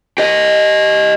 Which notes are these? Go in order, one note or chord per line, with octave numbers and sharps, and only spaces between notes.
G4 D#5